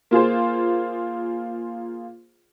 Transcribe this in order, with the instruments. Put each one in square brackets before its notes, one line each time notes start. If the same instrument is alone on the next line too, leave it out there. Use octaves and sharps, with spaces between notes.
[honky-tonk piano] A#3 F4 G#4 C5